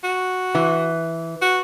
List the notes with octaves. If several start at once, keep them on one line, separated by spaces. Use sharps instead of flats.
F#4
E3
F#4